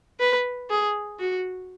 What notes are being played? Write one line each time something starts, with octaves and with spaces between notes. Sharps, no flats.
B4
G#4
F#4